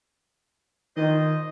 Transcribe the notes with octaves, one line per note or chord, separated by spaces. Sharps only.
A#2 D#3 C5 D#5